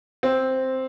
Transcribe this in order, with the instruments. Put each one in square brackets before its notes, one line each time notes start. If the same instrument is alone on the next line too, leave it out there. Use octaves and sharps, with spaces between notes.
[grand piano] C4